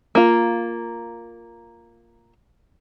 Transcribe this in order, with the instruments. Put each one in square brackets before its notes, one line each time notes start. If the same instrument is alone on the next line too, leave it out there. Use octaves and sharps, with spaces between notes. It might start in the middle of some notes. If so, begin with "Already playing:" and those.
[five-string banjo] A#3 F4